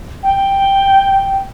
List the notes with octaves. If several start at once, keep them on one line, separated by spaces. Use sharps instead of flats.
G5